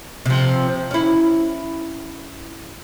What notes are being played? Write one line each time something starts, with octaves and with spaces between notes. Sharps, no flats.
C3 F3
C#4 E4